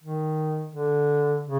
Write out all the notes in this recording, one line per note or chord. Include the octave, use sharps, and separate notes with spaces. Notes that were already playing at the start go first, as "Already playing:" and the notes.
D#3
D3
C#3